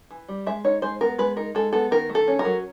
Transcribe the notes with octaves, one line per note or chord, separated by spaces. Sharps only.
E3
G3
G#3 E5
D#4 C#5
G#3 C5
B3 A#4
G#3 B4
D#4 A#4
G#3 A4
B3 A4
D#3 A#4
A3
A4
C#4
A#4
F#3